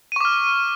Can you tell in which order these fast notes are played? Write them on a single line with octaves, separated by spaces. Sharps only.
D#7 C#6 D6 F6